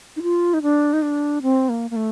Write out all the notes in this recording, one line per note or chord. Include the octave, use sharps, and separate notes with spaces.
D#4
F4
D#4
D4
D#4
D4
C4
A#3
A#3
A3